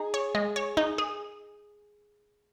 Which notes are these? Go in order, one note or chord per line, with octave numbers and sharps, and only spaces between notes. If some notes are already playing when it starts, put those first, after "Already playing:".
Already playing: D#4 G#4
C#5
G#3
C#5
D#4
G#4